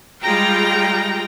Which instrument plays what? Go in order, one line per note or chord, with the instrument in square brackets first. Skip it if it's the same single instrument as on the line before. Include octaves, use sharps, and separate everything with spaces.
[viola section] G3 G#3 F4 G5 A#5